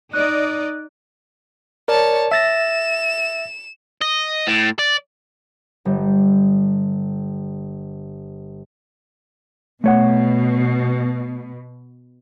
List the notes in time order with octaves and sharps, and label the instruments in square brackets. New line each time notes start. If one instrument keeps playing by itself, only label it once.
[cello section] D#4 D5 D#5 [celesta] F#6
[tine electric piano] A#4 D5 [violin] C#5 A5
[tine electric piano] E5 A6 A#6 [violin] E7
[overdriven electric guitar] D#5
A2
D5
[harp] G1 G3
[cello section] B2 [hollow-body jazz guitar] A3 C#5 F#5